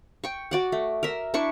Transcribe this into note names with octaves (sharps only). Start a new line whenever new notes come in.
G5 C#6
F#4 D5 F#5
A3
A#4 E5
D4 E4 C#6